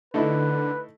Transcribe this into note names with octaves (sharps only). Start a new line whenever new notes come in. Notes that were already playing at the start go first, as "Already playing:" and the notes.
D3 A3 D#4 E4 B4